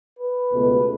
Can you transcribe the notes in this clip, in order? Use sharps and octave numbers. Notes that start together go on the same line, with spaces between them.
B4
C#2 B2 A3